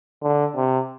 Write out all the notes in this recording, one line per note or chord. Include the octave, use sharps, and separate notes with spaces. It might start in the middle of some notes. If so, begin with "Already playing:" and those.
D3
C3